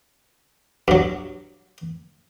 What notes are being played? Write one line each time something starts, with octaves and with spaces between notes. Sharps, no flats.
G2 F#3